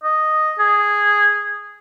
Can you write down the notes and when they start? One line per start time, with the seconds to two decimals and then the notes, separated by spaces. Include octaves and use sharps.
0.03 D#5
0.59 G#4